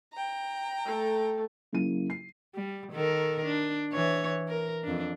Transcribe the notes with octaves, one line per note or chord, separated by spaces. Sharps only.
G5 A#5
A3 A4
C#3 F#3 A#3 E4 D#7
C7
G3
D#3 A4 A#4
D4
E3 C#5
A#4
F2 D4